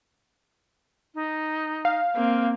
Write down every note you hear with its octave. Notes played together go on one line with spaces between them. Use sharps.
D#4
F5
A#3 C4